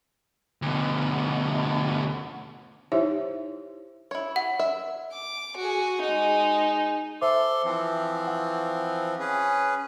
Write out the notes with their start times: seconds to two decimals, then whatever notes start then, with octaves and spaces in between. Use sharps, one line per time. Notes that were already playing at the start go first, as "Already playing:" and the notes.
0.62 D2 B2
2.92 D#4 E4 G4 C5 C#5 E5
4.11 E4 C#5
4.36 F#5
4.59 E5
5.12 D6
5.57 F#4 G#4
6.01 G#3 D#4
7.22 A4 C5 E5 C6 D6
7.64 E3 F3 C4
8.27 F#5
9.19 C#4 G#4 B4